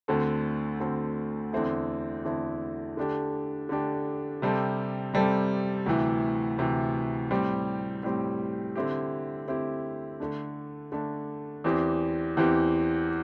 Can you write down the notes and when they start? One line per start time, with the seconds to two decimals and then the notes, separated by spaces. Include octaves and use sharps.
0.08 D2 D3 C4 A4
0.80 D2 D3 C4 A4
1.53 E2 D3 C4 E4 A4
2.25 E2 D3 C4 E4 A4
2.97 D3 A3 D4 G4
3.69 D3 A3 D4 G4
4.42 C3 G3 C4 A4
5.14 C3 G3 C4 A4
5.86 D2 C3 E3
6.58 D2 C3 E3
7.31 A2 G3 C4 G4
8.03 A2 G3 C4 G4
8.75 D3 C4 E4 G4
9.47 D3 C4 E4 G4
10.20 D3 A3 D4
10.92 D3 A3 D4
11.64 E2 E3 C4 G4
12.37 E2 E3 C4 G4